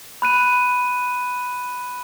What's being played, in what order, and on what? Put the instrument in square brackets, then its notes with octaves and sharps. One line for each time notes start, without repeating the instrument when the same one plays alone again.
[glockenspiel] B5 F#6 D#7